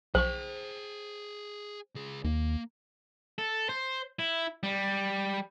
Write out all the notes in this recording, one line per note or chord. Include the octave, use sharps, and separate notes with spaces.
B1 F3 G#4 C5 G5 C#6
C#2 G#4
D#2 A#3
A4
C5
E4
G3